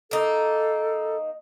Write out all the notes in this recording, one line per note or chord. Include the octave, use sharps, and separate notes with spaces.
A#3 D#4 A4